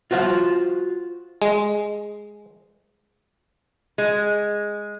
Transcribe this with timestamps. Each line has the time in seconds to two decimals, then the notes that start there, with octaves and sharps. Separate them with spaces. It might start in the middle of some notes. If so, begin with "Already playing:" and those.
0.11 F4 F#4 C5 F5
1.42 G#3
3.98 G#3